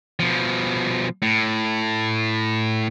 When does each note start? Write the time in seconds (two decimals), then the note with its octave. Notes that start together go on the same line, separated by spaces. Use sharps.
0.20 B2 F3
1.22 A2